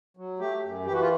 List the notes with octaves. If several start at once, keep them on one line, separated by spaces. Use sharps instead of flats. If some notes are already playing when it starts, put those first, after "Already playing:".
F#3
A3 G4
F#2
E3 G4
F#4
F4